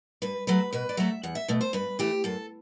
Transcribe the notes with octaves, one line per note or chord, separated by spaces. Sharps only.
G2 B4
F#3 A3 B4
B2 B4
D5
F#3 A3 E5
E2 F#5
E5
B2 A3
C5
G2 B4
E3 A3 G4
F#2 A4